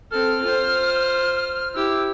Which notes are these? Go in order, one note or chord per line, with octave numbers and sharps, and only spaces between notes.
C4 A4 F6
F4 C5
E4 G4 E6